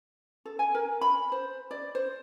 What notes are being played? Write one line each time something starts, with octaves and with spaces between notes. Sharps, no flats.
A4
G#5
A#4
B5
C5
D5
C5